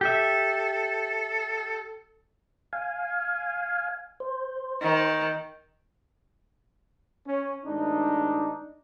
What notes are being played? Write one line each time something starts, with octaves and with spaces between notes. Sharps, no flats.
G4 A4 E5
F5 G#5
C5
D#3
C#4
A1 G#3 D4 D#4